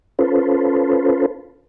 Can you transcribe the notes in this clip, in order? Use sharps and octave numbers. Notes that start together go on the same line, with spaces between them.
C#4 F4 A4 B4 C5